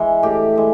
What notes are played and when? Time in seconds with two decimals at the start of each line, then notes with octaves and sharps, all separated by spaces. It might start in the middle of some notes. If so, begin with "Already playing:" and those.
Already playing: E3 G#3
0.23 A2 G4
0.55 E3 G#3